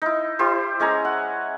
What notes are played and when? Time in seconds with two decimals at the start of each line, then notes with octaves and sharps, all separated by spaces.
0.02 D#4 E4
0.39 E4 G4 C5
0.80 G#3 C#4 G#5 A#5
1.05 F#5